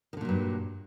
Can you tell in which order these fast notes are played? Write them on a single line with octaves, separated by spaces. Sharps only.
D#3 D3 A#2 F#3 G2